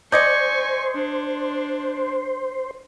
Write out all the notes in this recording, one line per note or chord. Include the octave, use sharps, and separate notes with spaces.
C5 D5 D#5 G#5 C#6 G6 G#6 C#7
D4